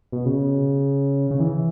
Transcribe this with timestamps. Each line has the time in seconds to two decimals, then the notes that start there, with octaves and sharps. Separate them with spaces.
0.12 B2
0.26 C#3
1.31 C#3
1.40 E3